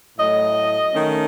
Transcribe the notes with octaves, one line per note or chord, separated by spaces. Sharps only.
A2 F#3 A3 D#5
D#3 A3 C#4